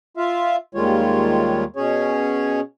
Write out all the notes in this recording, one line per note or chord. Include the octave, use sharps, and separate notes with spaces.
F4 E5 F5
D#2 D#3 G3 G#3 F4 C#5
B2 C#4 G#4 C#5